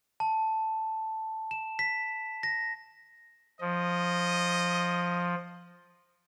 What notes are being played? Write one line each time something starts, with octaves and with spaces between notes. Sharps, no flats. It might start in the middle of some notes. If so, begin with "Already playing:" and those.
A5
E7
B6
A#6
F3 D#5